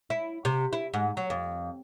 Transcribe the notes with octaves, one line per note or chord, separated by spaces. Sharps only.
E4
C3
E4
G#2
F#3
F2